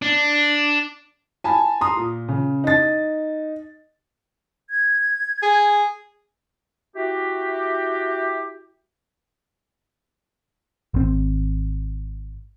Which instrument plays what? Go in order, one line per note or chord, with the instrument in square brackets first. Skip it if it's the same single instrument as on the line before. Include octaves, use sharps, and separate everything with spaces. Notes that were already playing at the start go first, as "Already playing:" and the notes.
[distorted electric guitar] D4
[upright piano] G#5 A5 B5
A#5 C6 D#6
A#2
C#3
D#4 A6
[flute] G#6
[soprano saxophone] G#4
[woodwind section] E4 F#4 G4
[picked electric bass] G#1 C4